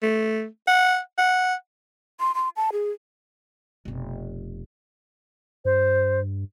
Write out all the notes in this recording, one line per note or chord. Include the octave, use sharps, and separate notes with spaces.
A3
F#5
F#5
C6
C6
A5
G#4
F1 B2
G2 C5